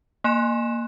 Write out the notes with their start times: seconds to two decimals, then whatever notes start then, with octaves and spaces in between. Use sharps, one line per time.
0.24 A#3 G#5 C6 F#6 E7